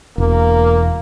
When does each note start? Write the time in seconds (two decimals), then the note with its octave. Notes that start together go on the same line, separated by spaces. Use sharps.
0.18 E1 A#3